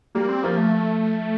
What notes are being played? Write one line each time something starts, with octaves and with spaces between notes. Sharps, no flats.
G3 A#3
C4
F3 A#3
A3